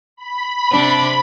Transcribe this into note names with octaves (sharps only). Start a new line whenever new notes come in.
B5
C3 D4